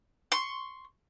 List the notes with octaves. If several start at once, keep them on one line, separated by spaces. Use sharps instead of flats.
C6 C#6